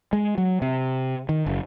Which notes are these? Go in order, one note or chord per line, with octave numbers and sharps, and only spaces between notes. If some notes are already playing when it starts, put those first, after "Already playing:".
G#3
F#3
C3
D#3
F#1